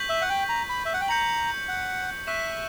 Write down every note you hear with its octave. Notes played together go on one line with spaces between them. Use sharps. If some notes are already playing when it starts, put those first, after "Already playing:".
Already playing: C#6 G6 B6 F#7
E5
F#5
G5
A#5
B5
E5
F#5
G5
A#5 G6 C#7 F#7
F#5
E5 C#6 F#6 B6 E7